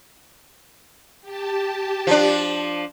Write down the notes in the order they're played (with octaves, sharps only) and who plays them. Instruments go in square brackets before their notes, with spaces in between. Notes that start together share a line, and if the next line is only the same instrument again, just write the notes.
[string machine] G4 A5
[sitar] F3 D4